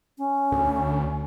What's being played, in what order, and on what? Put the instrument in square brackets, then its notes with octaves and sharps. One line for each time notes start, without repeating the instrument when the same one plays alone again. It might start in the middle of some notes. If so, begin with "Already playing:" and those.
[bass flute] C#4
[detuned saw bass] D2